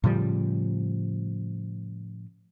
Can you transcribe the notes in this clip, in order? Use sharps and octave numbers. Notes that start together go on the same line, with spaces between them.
A2 C#3 F3 G3